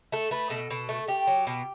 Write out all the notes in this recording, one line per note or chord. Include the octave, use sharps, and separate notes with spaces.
A3 A4
A3 B4
B2 A4
B2
A3
A3 G4
F#3
B2